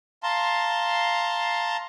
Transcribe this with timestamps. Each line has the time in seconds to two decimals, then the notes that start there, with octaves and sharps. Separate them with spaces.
0.23 F5 A5 A#5 C6